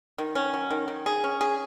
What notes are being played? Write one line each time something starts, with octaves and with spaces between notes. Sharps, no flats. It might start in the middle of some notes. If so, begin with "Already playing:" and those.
D#3
C#4
F#3
D#3
D#3
G#4
C#4
G#4